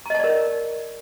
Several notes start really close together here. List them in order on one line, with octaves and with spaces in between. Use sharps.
A#5 D#5 A5 D5 A#4